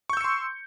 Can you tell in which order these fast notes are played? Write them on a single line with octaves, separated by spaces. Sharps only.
C#6 G6 E6 C#7 C6